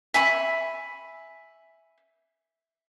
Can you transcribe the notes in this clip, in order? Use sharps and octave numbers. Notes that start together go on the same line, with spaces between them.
E5 G#5 B5 C#6